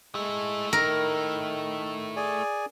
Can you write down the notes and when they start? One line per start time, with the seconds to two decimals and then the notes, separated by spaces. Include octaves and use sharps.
0.15 G#3 A3 E4
0.73 D#3 A#4
2.16 G#4 D5 G#5